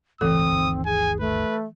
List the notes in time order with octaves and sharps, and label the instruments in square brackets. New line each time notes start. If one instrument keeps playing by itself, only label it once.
[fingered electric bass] G1 C#2 A2 [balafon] E3 A4 [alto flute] C4 [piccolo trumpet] D#6
[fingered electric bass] G1 D2 D#3
[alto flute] G#4 [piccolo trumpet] G#5
[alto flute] A3 [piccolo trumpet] B4